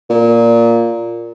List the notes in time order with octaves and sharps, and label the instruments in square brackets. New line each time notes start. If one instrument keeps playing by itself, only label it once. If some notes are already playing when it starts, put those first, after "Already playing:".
[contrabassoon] A#2